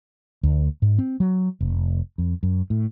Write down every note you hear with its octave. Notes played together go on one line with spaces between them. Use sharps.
D2
G#2
C4
F#3
F1
F2
F#2
A2